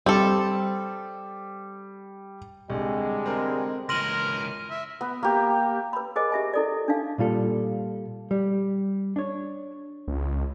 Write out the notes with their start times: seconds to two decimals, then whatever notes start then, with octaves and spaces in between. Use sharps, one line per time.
0.06 G3 C4 A4
2.70 C2 D3 G3 G#3
3.26 C4 A#4
3.89 C#2 E3 A#4 C6 F6 A#6 D#7 F#7
4.70 E5
5.01 B3
5.23 A#3 G4
5.93 B4 B5
6.16 G#4 A#4 C5 D#5 G#5 D6
6.32 G4 E5 G#5
6.54 E4 A4 D5
6.88 D4 D#4 F5
7.18 A#2 G3 F4 A4
8.31 G3
9.16 D4 C#5
10.08 C#2